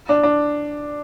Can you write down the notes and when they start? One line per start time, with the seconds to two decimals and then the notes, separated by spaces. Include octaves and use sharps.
0.09 D4
0.23 D4